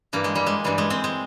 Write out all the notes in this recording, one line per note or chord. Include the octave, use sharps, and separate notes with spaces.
G2 E3 A#3
G#3
G3
G#3
G2 E3 G3
G#3
C4
G#3